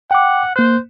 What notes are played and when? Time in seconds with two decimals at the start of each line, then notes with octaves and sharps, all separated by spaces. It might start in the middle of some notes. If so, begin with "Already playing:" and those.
0.11 F#5 G5 D6
0.56 A#3 C5 F#6